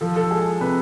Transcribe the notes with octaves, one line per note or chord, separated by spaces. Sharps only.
F3 A4
A4
G#3 G#4
C3 B4